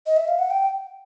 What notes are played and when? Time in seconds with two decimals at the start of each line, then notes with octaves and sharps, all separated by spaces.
0.06 D#5
0.17 E5
0.28 F5
0.39 F#5
0.50 G5